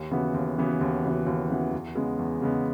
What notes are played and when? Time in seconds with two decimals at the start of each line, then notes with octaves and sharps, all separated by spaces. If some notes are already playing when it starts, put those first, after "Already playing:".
Already playing: D#2
0.11 C#3 E3 B3 F#4
0.34 D#2
0.58 C#3 E3 B3 F#4
0.81 D#2
1.04 C#3 E3 B3 F#4
1.26 D#2
1.50 C#3 E3 B3 F#4
1.73 E2
1.95 C#3 G#3 B3
2.19 E2
2.42 C#3 G#3 B3